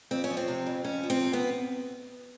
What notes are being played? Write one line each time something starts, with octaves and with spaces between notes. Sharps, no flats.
F2 C4
C#4
F3
C4
C3
F2
F2 C#4
F3
C4
C3
B3